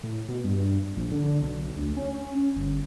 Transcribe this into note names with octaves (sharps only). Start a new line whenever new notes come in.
A2
B2
G2
A#1
D3
B1
D2
C#4
G1